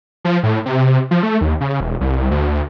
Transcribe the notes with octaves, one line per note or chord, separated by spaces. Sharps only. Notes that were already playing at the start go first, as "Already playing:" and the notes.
F3
A2
C3
F3
A3
D#2
C#3
E1
C2
D2